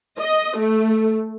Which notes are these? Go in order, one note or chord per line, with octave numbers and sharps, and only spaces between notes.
D#5
A3